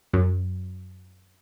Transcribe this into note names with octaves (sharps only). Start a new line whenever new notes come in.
F#2